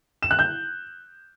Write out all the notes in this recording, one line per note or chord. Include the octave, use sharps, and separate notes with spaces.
E7
F#6
G6